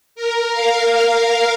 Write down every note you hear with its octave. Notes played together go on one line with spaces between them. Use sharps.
A#4
F5
F5